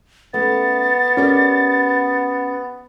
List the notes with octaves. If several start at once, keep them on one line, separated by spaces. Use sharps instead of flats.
A3 B3 C#4 A6
C#4 G4 A#4 D5